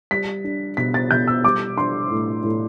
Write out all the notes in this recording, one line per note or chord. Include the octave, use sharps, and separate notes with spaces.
G3 B6
D4
B2 B6
A6
B2 G6
E6
G3 D6
D4 C6
A2
A2